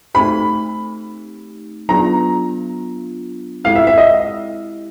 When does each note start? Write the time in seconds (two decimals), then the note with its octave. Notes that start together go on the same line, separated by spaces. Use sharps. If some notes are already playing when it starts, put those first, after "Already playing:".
0.14 A3 C4 D#4 G4 B5
1.89 F#3 B3 D4 F4 A#5
3.64 G#3 C4 E4 G4 F5
3.75 E5
3.87 E5
3.98 D#5